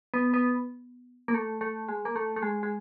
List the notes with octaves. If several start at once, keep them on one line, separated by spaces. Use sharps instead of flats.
B3
B3
A#3
A3
A3
G#3
A#3
A3
A3
G#3
G#3